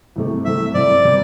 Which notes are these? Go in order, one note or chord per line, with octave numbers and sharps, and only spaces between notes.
C2 C3 A3
C2 C3 A3 E5
C2 C3 G3 C4 D5
C3 G3 C4